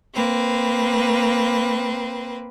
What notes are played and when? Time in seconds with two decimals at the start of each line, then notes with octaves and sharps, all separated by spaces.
0.14 A#3 C4 B4